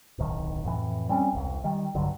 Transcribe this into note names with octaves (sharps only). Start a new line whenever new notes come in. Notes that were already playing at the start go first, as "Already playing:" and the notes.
D1 B1 D#3
F2 A2 E3
G3 C4 C#4
E1 C2
D#3 G3
B1 G2 D3 F#3